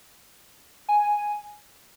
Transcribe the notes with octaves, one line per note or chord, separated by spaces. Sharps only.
G#5